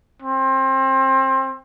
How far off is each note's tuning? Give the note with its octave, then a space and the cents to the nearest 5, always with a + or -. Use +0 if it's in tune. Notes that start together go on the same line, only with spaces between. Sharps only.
C4 +25